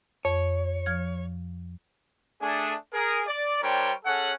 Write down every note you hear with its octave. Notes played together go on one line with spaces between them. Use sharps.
F2 C#5
F3 F6 G#6
A3 D4 G#4
G#4 A#4
D5
G3 D4 A#4 C5 C#5 G5
C#4 G#4 A4 C#5 F#5